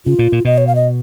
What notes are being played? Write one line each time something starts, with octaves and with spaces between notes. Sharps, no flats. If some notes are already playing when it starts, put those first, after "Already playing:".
C#3 F4
A#2
A#2
B2 D#5
C#5
F5
D#5